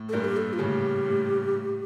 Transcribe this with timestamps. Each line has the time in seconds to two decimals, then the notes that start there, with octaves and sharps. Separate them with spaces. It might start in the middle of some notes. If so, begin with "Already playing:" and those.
Already playing: A2
0.09 A4
0.13 G2 A#2 A#4
0.24 G4
0.37 A4
0.53 F4
0.59 A2 C#3 G4
1.06 A2
1.52 A2